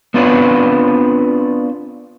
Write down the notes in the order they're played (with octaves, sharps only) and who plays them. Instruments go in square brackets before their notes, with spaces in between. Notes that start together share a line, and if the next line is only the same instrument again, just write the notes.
[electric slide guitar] B3 C4 D4 F4 B4 C#5